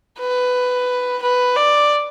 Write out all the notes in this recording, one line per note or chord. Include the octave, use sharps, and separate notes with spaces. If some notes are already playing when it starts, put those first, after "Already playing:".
B4
B4
D5